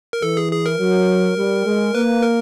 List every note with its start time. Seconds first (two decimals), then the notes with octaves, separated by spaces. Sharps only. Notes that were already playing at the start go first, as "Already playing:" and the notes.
0.13 A#4
0.22 E3 A4
0.37 G#4
0.52 G#4
0.66 A#4
0.80 F#3
1.37 G3
1.66 G#3
1.94 A#3 B4
2.22 A#4